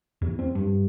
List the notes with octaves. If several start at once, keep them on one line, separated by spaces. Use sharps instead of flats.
E2
C4
G2